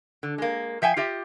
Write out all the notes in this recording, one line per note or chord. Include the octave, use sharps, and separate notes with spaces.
D3
G#3 A#3
F3 E5 G5 G#5
F4 G4 D#5 E5